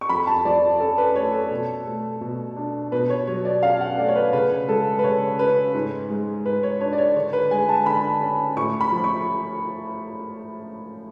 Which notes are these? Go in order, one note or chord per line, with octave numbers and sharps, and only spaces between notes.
C#6
F2 B5
A5
F3 D5
C#4 A4
B4
A3 C#5
A4
B2
A3
B2
D4
B2 B4
C#5
F#3 C#5
D5
C#4 F5
F#5
A3 D5
C#5
B4
C#3 B4
G#3 A4
B4
C#3 C#5
C#4 B4
G#2
G#3
G#2 B4
C#5
D4 C#5
D5
C#5
D3 C#5
B4
G#3 G#5
A5
D3 B5
C#4
A2 C#6
B5
F3
C#6